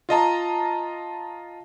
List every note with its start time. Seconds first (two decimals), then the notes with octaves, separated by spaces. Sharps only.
0.09 F4 D#5 A5 A#5